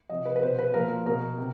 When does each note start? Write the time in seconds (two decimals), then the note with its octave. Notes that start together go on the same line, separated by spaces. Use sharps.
0.09 C3 F3 D#5
0.25 B4
0.36 B4
0.42 B2 C5
0.59 B4
0.74 A#2 F3 A#4
1.06 B2 A#4
1.38 C3